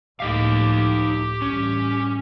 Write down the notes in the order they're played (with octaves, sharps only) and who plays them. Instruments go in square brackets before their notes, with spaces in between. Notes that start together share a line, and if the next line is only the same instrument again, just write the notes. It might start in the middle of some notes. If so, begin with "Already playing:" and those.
[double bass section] C#2 A2 F3 [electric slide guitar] D#4 D#5 F5 [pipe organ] G4
[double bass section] A1 G2 [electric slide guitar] C#4